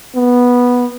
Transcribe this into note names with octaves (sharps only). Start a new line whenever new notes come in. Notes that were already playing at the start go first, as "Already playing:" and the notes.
B3